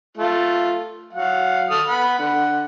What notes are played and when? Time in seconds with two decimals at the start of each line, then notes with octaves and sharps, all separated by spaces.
0.17 A3 F4
1.13 F#3 F5 F#5
1.71 A4 D#6 F6
1.87 F#5 B5
2.19 D3 F#5